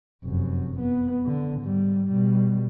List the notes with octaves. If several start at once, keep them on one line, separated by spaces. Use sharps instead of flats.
F1 F#2
B3
D3
G#2 G3
B2 G3